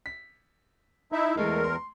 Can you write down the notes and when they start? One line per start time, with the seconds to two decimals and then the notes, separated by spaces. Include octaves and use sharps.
0.06 B6
1.12 D#4 E4 E5
1.37 E2 G#3 A3 A#4
1.64 C6